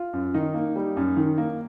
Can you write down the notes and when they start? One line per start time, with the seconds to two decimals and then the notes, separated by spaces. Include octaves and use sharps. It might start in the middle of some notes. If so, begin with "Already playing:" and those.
Already playing: F4
0.13 F#2
0.34 D#3 D#4
0.54 A#3
0.76 G3
0.97 F#2
1.17 D#3
1.38 A#3